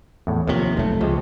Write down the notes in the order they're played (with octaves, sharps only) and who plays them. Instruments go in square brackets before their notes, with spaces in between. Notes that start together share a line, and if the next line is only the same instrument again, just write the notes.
[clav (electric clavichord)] E2 A2
[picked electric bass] D#2 C3 [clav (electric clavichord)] D#3 F3 C#5
[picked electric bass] F1 A3 [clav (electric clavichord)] B1
[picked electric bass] C#2 [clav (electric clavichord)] F3 G#3 C4